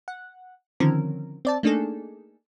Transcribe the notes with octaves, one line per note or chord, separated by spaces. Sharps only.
F#5
D3 D#3 F3 C4 C#4 A#4
C4 D5 A5
A3 A#3 D4 D#4 G#4 A4